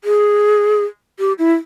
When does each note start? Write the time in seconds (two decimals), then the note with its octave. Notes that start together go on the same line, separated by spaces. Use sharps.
0.04 G#4
1.19 G4
1.39 E4